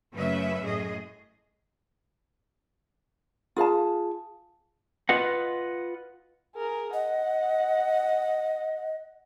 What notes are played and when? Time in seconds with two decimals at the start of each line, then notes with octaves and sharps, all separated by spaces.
0.13 F#2 C#3 A3 C#4 B4 E5
0.62 F#2 A2 G#4 D#5
3.56 F4 G#4 F5 A5
5.09 F4 B4 D#5 F#5
6.55 G#4 A#4
6.93 D#5 F#5